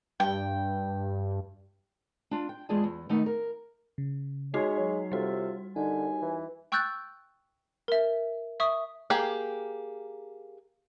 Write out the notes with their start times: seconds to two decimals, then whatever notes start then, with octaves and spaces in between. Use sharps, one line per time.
0.20 G2 G5
2.31 D4 F4
2.49 G5
2.69 E2 G#3 F4 G#4 D5 A5
2.84 E2
3.09 D#3 A3 B3 D#4
3.26 A#4
3.98 C#3
4.54 G#3 D#4 F#4 C#5 C7
4.78 F#3 C#5
5.12 C3 G3 F4 F#4 A4
5.76 D#2 D3 D#4 G#5
6.22 E3
6.72 G5 C#6 E6 F#6 G6 A6
7.88 A#4 E5
8.60 E5 C#6 D#6
9.10 A#3 G4 G#4 G5